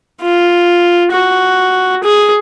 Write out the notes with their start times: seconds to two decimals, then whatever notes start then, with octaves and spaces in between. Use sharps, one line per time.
0.21 F4
1.12 F#4
2.03 G#4